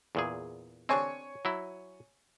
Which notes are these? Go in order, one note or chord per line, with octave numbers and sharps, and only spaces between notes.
E2 A#2 G#4
C4 D4 C#5 G#5 C#6
F#3 E4